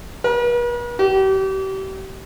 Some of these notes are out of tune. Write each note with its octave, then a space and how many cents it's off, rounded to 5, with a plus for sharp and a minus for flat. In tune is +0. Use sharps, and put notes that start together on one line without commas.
B4 -45
G4 -35